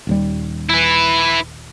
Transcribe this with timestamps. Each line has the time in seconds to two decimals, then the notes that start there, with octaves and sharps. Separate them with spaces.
0.07 D#1 D#2 G3
0.70 E4 B4